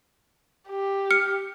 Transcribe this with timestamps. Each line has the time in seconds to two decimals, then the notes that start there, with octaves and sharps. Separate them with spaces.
0.69 G4
1.11 F6 C#7